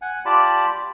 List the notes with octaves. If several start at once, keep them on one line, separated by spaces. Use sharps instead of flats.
F#5 G#5
F4 G4 D5 A5 B5